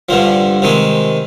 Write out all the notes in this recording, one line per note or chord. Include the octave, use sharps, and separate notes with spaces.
G2 D3 F3
C3 D#3 G#3